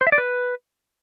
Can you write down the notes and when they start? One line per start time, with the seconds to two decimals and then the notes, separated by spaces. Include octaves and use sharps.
0.01 C5
0.07 E5
0.12 D5
0.18 B4